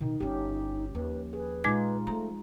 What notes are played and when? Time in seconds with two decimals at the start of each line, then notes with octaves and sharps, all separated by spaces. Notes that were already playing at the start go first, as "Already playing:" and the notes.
0.01 B2 D#3 D#4
0.20 G1 C#4 F4 G4
0.95 D#2 F3 B4
1.33 G#4 B4
1.64 A#2 G#3 D#4 F4 D6 G#6
2.07 F3 G#3 A3 A#5